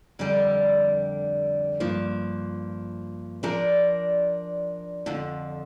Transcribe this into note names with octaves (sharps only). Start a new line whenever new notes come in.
F2 D3 G3 D4 G4
G2 F3 A#3
F3 D4 A#4 D5
F2 D3 F3